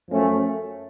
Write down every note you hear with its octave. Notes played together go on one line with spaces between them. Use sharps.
F#2 F3 A3 C#4